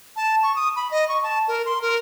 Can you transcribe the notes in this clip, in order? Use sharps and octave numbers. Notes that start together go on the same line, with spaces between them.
A5
C#6
D#6
B5
D#5
C#6
A5
A#4
C6
A#4